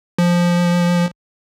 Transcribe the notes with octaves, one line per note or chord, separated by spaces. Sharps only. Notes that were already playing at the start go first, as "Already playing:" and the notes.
F3